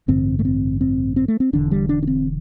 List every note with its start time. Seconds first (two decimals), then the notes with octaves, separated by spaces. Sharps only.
0.08 A1 G2 D3 C4
0.39 A3
0.45 C4
0.81 C4
1.16 C4
1.28 A3
1.40 C4
1.53 E1 E2 D3 D4
1.71 G3
1.89 D4
2.03 D4
2.07 C4